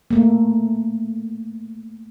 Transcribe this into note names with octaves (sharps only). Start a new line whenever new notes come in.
A3 A#3